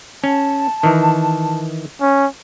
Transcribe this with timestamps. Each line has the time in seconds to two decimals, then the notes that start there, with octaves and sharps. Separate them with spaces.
0.24 C#4 A5
0.83 D#3 E3
2.00 C#4